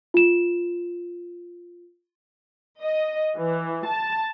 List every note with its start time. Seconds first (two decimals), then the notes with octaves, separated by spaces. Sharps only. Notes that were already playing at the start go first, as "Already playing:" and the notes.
0.14 F4 E7
2.82 D#5
3.37 E3
3.86 A5